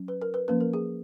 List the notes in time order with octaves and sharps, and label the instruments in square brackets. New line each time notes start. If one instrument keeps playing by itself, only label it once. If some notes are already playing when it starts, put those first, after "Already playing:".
Already playing: [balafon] F#3 C#4
B4
A#4
B4
F3 A#3 C#4 B4
A#4
G#4